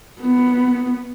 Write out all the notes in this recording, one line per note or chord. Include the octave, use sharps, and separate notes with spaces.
B3